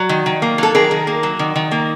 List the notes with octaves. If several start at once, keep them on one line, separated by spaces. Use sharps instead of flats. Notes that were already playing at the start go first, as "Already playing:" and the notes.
Already playing: F#3
D#3
D#3
A#3
F#3 A4
D#3 G#4 A#4
D#3
A#3
F#3
D#3
D#3
A#3